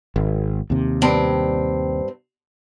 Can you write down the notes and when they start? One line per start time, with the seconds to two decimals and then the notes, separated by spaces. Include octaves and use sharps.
0.16 G#1
0.70 D#2 C3
1.02 G2 C4